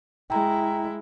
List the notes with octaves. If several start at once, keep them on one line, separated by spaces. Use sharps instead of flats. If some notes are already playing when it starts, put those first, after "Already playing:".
G#3 E4 G5 A#5